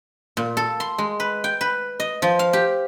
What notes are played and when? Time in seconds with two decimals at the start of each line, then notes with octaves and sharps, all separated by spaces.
0.37 A#2
0.57 A4
0.80 C6
0.98 G#3
1.20 B4
1.44 G5
1.61 B4
2.00 D#5
2.22 F3
2.39 F5
2.53 G4